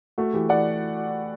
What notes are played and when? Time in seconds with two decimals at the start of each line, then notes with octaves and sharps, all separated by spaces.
0.18 A3 F#4
0.34 E3 G4
0.49 E3 D5 F#5